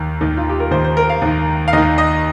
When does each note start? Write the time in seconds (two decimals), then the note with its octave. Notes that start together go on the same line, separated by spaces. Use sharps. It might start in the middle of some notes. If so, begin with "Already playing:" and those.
Already playing: D#2 D#3
0.21 D#2 D#3
0.37 F4
0.49 G4
0.60 A#4
0.71 D#2 D#3 C5
0.85 C5
0.97 A#4
1.10 F5
1.22 D#2 D#3
1.68 F5
1.73 D#2 D#3 D#5
1.98 D#5